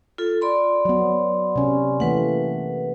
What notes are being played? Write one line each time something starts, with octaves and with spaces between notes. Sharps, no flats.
F4 A4
D5 B5 C6
F#3 B3
C3 C#4
E3 A3 A#3 B4 F#5